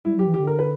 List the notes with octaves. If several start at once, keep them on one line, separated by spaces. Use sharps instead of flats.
G3 E4
F#3
G4
E3
D3 G4
A#4
B4